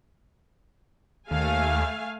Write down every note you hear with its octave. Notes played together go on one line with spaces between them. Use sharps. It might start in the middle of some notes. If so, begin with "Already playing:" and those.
D#2 A3 F5 G#5